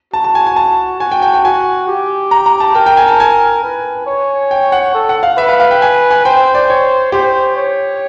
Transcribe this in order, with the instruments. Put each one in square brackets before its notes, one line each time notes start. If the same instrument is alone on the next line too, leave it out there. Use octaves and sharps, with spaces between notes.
[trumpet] F#4 [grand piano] A5
[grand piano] A5
G#5
G#5
A5
[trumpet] F#4 [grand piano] G#5
[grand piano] G5
G5
G5
[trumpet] F#4 [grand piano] G#5
[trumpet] G4
[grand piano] A#5
A#5
A5
[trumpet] A#4 [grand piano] G5
[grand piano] G5
G#5
A5
G#5
[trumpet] B4
C#5
[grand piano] G5
F#5
[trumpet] A4
[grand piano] F#5
F5
[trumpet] B4 [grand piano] E5
[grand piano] F5
F5
G5
G#5
G#5
[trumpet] C5 [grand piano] G5
[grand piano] D5
C#5
[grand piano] G4 [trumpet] C5
[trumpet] C#5